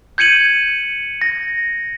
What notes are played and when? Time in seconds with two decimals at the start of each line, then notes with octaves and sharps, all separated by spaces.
0.18 G6 G#6 C#7 D#7 F#7
1.21 A#6